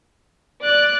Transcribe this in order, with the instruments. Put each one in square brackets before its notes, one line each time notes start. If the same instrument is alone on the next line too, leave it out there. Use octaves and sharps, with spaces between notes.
[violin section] D5 [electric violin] F#6